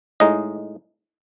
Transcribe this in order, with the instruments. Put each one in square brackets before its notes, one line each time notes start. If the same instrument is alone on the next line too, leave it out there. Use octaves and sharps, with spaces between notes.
[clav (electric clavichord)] A2 G#3 D#4 D#5